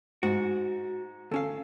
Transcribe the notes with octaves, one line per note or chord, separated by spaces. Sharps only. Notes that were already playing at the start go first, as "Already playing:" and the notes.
G#2 F#4
D2 C#4 A4 F5